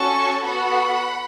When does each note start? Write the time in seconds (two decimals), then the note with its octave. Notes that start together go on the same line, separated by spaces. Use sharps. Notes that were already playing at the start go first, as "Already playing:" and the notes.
Already playing: C#4 F#4 A4 A5 C#6
0.44 B3 F#4 A4 F#5 B5